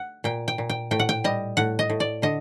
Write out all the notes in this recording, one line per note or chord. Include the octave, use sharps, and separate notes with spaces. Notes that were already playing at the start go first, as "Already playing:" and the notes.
Already playing: F#5
A#2 G5
G5
A#2
G5
A2 G5
F#5
G5
G3 D#5
A2 F#5
D#5
A2
D5
D3 D#5